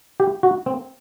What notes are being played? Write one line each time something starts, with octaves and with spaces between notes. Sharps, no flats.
G4
F#4
C4